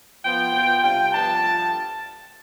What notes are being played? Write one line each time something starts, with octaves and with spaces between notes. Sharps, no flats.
F3 B3 F4 G5
B2 B3 F4
C3 G3 D4 F4 G5
G2 F3 B3 D4 A5
G2 F3 A3